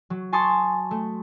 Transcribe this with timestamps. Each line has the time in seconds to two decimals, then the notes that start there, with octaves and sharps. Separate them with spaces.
0.10 F#3
0.32 G#5 A5 C6 C#6 D#6 A6
0.91 A3